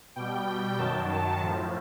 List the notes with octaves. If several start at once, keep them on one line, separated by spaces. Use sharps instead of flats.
B2 G3 G5
G5
F#2 D#3 F#3 A5
A5
A2 F3